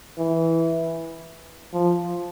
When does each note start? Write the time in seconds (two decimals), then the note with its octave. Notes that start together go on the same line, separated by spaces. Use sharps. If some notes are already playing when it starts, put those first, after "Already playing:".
0.18 E3
1.73 F3